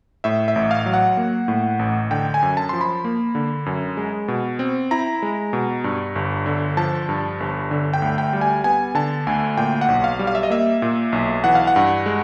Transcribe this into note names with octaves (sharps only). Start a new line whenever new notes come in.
A2 E5
E5
A1
F5
F#3
F#5
A#3
A2
A1
D3 G5
G#5
F#2
A5
F3 C6
B5
A#3
D3
F#2
G#3
B2
C4
E4 A#5
G#3
B2
G2
G1
D3
F3 A5
G2
G1
D3
G5
D2
G5
G3
G#5
B3 G#5
D3 A5
D2 G#5
A#2 G5
F#5
B1
F5
G3
F5
E5
D#5
A#3 E5
A#2
B1
E3 F#5
F5
F#5
G2
G#3